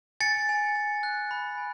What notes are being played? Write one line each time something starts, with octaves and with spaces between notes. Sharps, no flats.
G#5 A6 C#7
G#5
G#5
F#6
B5
G#5